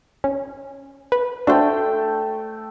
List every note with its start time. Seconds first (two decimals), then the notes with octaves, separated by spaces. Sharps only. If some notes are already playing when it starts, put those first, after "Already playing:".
0.24 C#4
1.12 B4
1.47 A3 D4 F#4 C5 G5